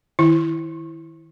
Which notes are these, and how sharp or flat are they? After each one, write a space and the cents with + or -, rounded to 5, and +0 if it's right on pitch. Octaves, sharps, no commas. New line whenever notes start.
D#3 +15 E4 +0